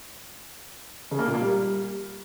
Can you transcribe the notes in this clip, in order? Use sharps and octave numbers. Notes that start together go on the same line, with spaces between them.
C#3
A#3
A#2
A#3
G3